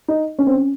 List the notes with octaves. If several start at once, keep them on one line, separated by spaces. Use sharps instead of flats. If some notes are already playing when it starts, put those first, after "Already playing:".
D#4
C#4
C4
C#4